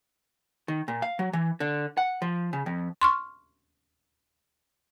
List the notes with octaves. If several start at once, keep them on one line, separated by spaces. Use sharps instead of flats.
D#3
A#2
F5
F#3
E3
D3
F#5
F3
C#3
F2
C6 C#6 F6